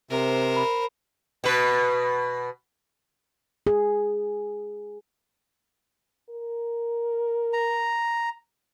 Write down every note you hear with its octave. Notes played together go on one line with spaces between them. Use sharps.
C3 A#4 C5
B5
B2 B4
G#4
A#4
A#5